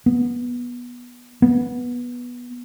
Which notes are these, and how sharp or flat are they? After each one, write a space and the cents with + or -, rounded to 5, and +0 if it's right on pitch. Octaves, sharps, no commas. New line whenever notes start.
B3 -15
B3 -15